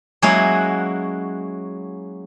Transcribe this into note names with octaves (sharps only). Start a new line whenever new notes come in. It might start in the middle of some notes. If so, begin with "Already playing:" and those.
F#3 G#3 A#3 C#4 E4 F#4